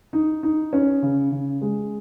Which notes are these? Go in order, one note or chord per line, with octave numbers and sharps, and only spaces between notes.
D#4
D#4
C#4
C#3
C#3
G#3